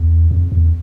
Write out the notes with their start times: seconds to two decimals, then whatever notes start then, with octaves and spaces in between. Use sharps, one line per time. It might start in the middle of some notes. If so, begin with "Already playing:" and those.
Already playing: E2
0.31 F2
0.52 E2